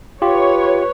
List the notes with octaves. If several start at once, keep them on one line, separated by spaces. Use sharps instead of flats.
F4 G4 B4 C#5